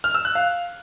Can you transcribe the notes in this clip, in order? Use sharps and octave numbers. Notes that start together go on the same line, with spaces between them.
F6
E6
F#6
F5